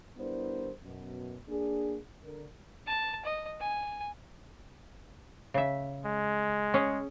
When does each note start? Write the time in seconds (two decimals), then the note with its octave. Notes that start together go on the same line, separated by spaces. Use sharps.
0.17 G3 B3 D4 E4 A#4 C5
0.83 F#2 B2
1.48 A#3 D4 G#4
2.24 D3 A#4
2.86 A5
3.25 D#5
3.60 G#5
5.54 C#3 E5
6.06 G#3
6.74 C#4 G#4 C#5